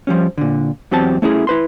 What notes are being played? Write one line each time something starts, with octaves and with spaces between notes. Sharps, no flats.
F3 G3 C#4
A#2 D3
E2 F#3 C4 G4 A5
A3 C#4 E4 G#4
E4 B4 C6